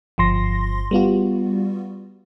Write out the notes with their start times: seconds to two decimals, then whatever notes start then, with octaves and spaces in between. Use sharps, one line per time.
0.18 G1 F3 C6 A#6
0.91 G3 B3 F4 F#4